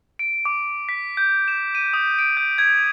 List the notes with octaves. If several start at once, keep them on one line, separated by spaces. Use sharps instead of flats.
D7
D6
B6
G6
E7
D#7
D#6
D7
G6
G#6